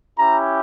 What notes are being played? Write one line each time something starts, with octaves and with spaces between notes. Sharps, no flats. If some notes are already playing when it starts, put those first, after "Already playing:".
C#4 E4 G4 A#5